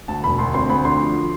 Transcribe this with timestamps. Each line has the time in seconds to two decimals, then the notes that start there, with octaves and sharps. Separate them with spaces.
0.08 D2 A5
0.23 E1 B5
0.38 D2 C6
0.54 C4 C6
0.69 D2 B5
0.85 D3 C6
1.00 F3